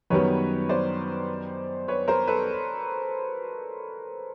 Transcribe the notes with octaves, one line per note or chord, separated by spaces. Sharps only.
F#2 D#3 G3 B3 B4 C#5
C5 D5
B4 C#5
A#4 C5
A4 B4